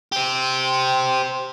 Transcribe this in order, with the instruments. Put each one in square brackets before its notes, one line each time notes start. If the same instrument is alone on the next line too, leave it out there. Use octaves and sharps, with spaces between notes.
[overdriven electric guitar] G4 C5